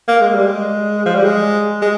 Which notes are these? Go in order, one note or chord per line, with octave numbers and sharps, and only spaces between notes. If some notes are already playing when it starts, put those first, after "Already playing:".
A#3
G#3
G3
G#3
F3
G3
G#3
G#3